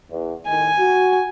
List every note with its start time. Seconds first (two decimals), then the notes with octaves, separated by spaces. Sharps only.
0.10 E2
0.46 A2 D#3 G#5
0.78 F#4